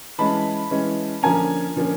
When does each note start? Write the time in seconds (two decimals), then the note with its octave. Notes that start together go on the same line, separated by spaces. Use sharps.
0.18 E3 G#3 C#4 A5 B5
0.71 E3 G#3 C#4
1.23 D3 F3 A#3 C#4 G#5 A#5
1.76 D3 F3 A#3 C#4